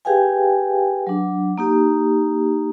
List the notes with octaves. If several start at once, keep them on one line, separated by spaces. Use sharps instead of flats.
G4 G#4 B4 F5 G5 G#5
F#3 D4
A#3 D#4 G4